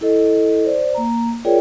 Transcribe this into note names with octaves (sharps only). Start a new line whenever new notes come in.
E4 A4 D#5
C5 D5
A#3 A#5
F4 G#4 A#4 C#5 D5 G5